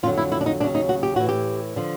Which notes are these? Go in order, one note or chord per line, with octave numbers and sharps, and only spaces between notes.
F2 D3 F#3 F4
E4
E4
D4
D#4
D#2 C#3 F#3 D4
D#4
F#4
G4
A2 E3 F#4
G4
D3 F3